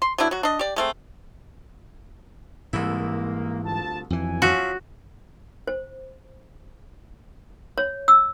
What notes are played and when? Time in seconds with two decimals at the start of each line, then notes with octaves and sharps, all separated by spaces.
0.02 C6
0.18 F#3 B3 D4 E4
0.31 F#3 F#4
0.43 D4 D#5
0.59 G4 D5
0.76 G#3 A3 C4
2.73 C2 G#2 E3 A#3 E4
3.64 D2 F4 A5
4.10 G1 F2 E3 F#3 G#5
4.42 F3 C#4 F#4 E5
5.68 C5
7.78 C#5
8.08 E6